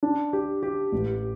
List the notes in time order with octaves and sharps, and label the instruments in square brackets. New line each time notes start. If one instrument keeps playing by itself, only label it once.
[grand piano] D4
G4
G4
A1